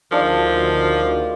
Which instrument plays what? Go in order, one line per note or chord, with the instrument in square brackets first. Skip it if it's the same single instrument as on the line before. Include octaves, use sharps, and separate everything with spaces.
[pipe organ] D2 [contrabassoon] D#3 [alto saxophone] F3 [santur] G#3 D4 F4